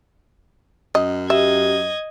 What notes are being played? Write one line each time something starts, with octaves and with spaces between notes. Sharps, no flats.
F#2 D#5
G4 D#5 E5 G#6